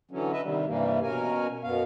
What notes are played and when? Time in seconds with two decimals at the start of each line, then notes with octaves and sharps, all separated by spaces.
0.11 D3 E3 F#3 C#4
0.32 B4 D#5 E5
0.43 C3 D#3 G3
0.67 G2 C3 E3 G3 A#3
1.03 B2 C#4 A#4 G#5
1.64 F#2 B2 B3 F5